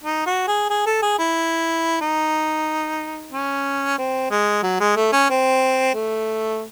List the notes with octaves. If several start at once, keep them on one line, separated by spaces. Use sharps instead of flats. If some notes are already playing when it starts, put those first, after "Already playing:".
D#4
F#4
G#4
G#4
A4
G#4
E4
D#4
C#4
C4
G#3
F#3
G#3
A3
C#4
C4
A3